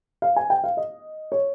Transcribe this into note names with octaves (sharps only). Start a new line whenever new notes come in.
F5
G#5
G5
F5
D#5
C#5